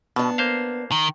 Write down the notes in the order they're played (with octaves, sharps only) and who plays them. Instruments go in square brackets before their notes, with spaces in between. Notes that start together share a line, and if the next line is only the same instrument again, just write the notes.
[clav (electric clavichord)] B2 [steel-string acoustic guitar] B3 D4
[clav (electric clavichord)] A#3 C5 F5
[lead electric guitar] D#3